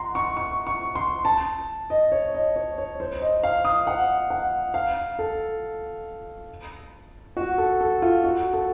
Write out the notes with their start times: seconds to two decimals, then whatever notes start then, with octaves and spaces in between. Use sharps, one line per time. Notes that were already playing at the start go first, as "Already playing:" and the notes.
Already playing: F#5 A#5 C6
0.15 C#6
0.37 C#6
0.67 C#6
0.95 C6
1.25 A5
1.90 D#5
2.12 C#5
2.34 D#5
2.56 C#5
2.78 C#5
3.00 C5
3.21 D#5
3.43 F5
3.65 D#6
3.87 F#5
4.30 F#5
4.74 F5
5.19 A4
7.37 F#4
7.58 A4
7.81 A4
8.02 F4
8.24 F#4
8.53 A4